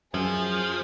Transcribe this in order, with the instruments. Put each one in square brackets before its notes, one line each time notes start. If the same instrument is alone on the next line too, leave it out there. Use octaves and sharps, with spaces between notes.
[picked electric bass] F#2 [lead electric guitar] F3 [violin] G#4